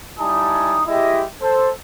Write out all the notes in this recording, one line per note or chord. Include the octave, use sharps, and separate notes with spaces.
G3 D#4 E4 G#5 A5 D#6
G#3 E4 G4 D#5 E5
A4 C5